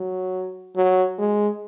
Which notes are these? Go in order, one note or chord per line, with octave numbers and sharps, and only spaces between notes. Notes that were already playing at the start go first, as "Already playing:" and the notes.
Already playing: F#3
F#3
G#3